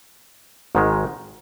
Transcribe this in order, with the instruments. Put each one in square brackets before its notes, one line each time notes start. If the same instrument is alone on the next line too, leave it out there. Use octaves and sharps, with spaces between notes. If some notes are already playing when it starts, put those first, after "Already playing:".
[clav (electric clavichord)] G#1 G#2 D#3 G#3